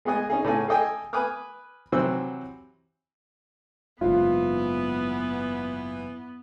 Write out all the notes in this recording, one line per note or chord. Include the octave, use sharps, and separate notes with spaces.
G#3 B3 G#4 D#5 G#5
C#4 D#4 G#4
A2 C#3 C#4 A4 G#5
G#4 A4 D#5 G5 G#5
B4 G#5 D6 D#6 F6
C3 E3 F#3 F#4 C5 E6
F#1 G#2 E3 B3 F4